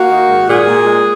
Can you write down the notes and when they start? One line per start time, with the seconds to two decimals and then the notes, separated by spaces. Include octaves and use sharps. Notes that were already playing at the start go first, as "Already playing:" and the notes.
Already playing: A#3 F#4
0.10 D#3
0.29 G#2
0.48 A#2 G#4
0.67 A#2
0.86 G#3